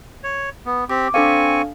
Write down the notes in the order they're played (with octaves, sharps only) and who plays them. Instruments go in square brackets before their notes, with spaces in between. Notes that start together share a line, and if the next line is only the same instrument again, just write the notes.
[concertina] C#5
B3
[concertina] C4 G4 [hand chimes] D6
[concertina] C4 G#5 C#6 [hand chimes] D4 A4 F5